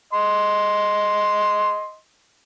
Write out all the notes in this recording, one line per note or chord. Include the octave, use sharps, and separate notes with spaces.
D#5 C6